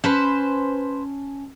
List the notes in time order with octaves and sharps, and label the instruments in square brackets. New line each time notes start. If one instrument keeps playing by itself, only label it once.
[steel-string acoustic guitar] C#4 A5 [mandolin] B4 C5